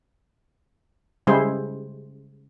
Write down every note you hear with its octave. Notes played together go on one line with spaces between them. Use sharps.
C#3 G3 G#3 E4 G#4 C5